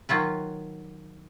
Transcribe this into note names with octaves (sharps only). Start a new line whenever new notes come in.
D#3 F#3 F4 B4